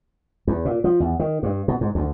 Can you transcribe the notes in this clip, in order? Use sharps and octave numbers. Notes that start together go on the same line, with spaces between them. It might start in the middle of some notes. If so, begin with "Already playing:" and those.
E2
A#2
F3
E2
D#3
G2
B2
G#2
D2